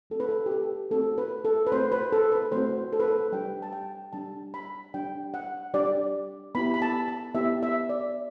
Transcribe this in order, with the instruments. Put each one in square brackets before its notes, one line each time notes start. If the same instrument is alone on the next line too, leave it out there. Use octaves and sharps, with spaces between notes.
[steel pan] A3 C4 F#4 A4
B4
A4
G4
A4
A3 C4 F#4 A4
B4
A4
B4
A3 C4 F#4 C5
B4
A4
B4
A3 C4 F#4 C5
A4
B4
A4
G3 D4 G4 G5
A5
G5
G3 D4 G4 A5
B5
G3 D4 G4 G5
F#5
G3 D4 G4 D5
B3 E4 G4 B5
B5
A5
A5
B3 E4 G4 E5
E5
D5